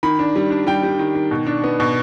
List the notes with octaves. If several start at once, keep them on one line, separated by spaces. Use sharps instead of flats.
D#3 B5
D4
G3
D4
G3 G5
G3
D#3
D#3
B2
D4
B3
B2